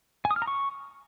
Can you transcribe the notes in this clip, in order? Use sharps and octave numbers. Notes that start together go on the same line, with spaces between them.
G#5
D#6
F6
A#5
C#6